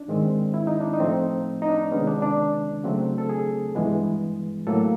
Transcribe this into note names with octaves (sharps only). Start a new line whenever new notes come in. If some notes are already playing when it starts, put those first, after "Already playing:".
Already playing: D4
G#2 D#3 G#3 C4
E4
D#4
D4
D#4
A2 F3 A3 C4
D#4
D4
C3 D#3 G#3 B3 C#4
D4
D4
C#3 F#3 A3 C4
A4
G#4
G2 E3 G#3 B3
A2 F#3 A#3 A4